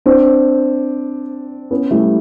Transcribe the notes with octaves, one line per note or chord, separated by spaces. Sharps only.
C4 D4
B3 C#4
G3 A3